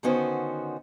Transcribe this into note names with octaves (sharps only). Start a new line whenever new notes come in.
D3 D#3 B3 C#4 F#4 C5